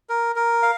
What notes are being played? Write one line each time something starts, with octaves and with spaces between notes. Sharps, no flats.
A#4
A#4
F5